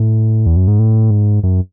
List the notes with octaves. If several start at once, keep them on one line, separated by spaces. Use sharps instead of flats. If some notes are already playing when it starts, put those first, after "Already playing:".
Already playing: A2
E2
F#2
G#2
A2
G#2
F#2